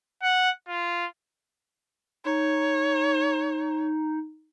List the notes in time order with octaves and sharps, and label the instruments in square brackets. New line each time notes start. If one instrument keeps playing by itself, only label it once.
[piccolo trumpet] F#5
F4
[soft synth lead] D#4 [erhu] C#5